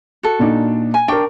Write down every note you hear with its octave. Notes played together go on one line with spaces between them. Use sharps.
F#4 A4
A#2 D4 D#4
G#5
D4 A#4 G5 C#6